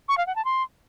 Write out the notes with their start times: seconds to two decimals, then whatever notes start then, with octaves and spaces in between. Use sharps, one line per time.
0.08 C#6
0.18 F5
0.27 F#5
0.36 A5
0.45 C6